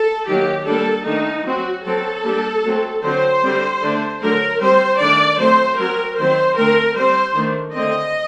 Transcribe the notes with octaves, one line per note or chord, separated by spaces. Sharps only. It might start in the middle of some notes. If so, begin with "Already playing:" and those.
Already playing: A4
D#3 F#3 A#3 G4
G3 A#3 D4 A4
D#3 A3 D4 D#4
F#3 C4 F#4
F#3 C4 A4
G3 A#3 D4
F#3 A3 C4
D3 F#3 C4 C5
D3 G3 C4
D3 A3 D4
D3 F#3 A3 A#4
G3 C4 C5
D#3 A3 D4 D5
F#3 A3 C4 C5
F#3 C4 A#4
D#3 F#3 C4 C5
D3 A3 C4 A#4
G3 C4 C5
D#3 A3 D4
D3 A3 C4 D#5